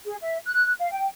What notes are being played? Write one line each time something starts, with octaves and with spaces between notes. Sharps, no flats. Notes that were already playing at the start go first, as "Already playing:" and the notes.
G#4
E5
F#6
F5
G5